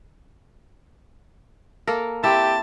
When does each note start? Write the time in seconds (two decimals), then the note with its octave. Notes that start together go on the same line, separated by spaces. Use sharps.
1.87 A#3 A4 A#4
2.24 C4 E4 G4 A5